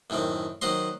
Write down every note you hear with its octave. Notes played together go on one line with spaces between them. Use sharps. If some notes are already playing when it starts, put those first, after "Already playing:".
F#2 A2 D#3 C4
D#3 F#3 C5 D#5 C6